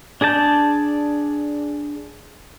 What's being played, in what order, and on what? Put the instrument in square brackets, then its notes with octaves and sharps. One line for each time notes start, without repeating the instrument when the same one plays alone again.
[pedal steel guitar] D4 G#4 D5 A5 G6